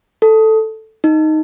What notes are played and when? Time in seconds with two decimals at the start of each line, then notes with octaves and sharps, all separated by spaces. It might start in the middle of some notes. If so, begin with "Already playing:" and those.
0.22 A4
1.04 D#4